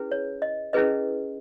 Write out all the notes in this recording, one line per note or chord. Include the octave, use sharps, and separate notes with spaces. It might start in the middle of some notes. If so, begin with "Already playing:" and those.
Already playing: C#4 E4 G#4 B4
C#5
D#5
C#4 E4 G#4 B4 D#5